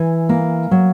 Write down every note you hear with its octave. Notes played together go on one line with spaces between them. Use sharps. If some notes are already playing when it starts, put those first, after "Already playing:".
Already playing: E3 G#5
A#3
F#3